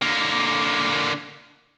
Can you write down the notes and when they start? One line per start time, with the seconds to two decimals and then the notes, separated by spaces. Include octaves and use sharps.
0.02 D3 A#3